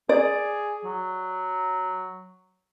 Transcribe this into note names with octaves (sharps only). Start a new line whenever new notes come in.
G#4 D5
F#3